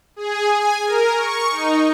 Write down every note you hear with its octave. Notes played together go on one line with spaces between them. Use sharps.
G#4
G#5
A#4
C#6
D#4